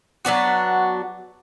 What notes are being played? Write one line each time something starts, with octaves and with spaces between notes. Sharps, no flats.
F#3 B3 D4 F#4